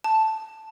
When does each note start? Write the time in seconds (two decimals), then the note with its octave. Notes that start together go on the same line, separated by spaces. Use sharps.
0.04 A5